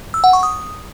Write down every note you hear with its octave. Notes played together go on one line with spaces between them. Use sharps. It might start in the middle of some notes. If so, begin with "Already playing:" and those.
E6
F#5
C#6
D#6